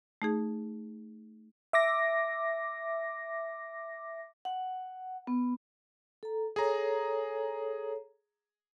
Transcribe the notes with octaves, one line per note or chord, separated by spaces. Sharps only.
A3 D#4 G#4
E5 D6 A#6
F#5
B3
A4 A#5
G#4 A4 C#5 A#5